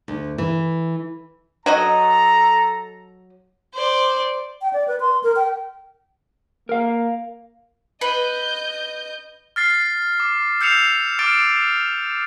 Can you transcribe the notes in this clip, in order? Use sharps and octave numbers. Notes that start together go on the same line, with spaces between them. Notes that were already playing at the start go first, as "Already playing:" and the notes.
D2
E3
F#3 F#4 A4 D#5 A#5
C5 D5
G5
D5
B4
C6
A#4
G5
A#3 A#4 F5
B4 D#5 G6
F6 A6 C7
D6
E6 G6 C7 C#7 E7 F7
D6 F6 A6 D7